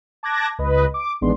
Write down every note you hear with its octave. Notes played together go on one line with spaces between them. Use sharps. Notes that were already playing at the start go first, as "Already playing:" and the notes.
A5 D6 F#6 G#6 A#6
C#2 B4 D#5
D6
A1 D#3 G#3 B3 D4 C6